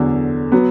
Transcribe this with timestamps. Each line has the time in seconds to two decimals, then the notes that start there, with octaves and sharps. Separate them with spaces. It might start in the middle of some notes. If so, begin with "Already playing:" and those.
Already playing: E2 D3 F#3
0.52 F#3 B3